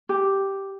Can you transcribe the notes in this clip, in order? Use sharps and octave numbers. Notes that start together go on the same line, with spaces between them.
G4